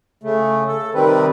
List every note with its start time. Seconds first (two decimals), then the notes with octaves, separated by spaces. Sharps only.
0.23 C#3 A3
0.68 A4
0.94 C3 D#3 G3 C4 B4